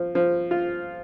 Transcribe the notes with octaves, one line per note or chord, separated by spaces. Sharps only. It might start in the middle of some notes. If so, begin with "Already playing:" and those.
Already playing: F3
F3
F4